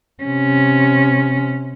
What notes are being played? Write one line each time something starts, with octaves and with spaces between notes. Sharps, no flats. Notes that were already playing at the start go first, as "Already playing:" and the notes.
C3 C#4